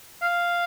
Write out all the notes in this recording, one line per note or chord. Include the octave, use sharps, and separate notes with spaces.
F5